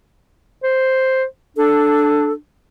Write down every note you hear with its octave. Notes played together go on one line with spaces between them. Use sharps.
C5
D4 A4